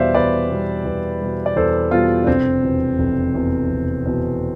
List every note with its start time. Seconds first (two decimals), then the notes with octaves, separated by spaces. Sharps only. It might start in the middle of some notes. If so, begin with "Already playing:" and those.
Already playing: E2 B2 G3 C5 D5 E5 F5
0.15 E2 B4 D5
0.50 B2 G3
0.85 E2
1.21 B2 G3
1.46 D5
1.56 E2 A4 C5
1.91 B2 G3 F4 A4
2.24 D4
2.27 F1 C4
2.63 E2 B2
2.99 F1
3.35 E2 B2
3.70 F1
4.06 E2 B2